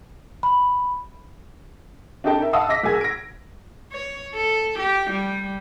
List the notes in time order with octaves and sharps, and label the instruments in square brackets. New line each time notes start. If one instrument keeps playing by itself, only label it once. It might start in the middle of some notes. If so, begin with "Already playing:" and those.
[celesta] B5
[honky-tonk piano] D4 G4 A4 D#5 G5 A5
D#4 A#4 E5
D#5 F5 F#5 A5 D#6 E6
D#5 D6 A#6 B6
B1 G#4 A#4 G#5 G#6
A#6 D7
[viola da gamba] C#5
A4
G4
G3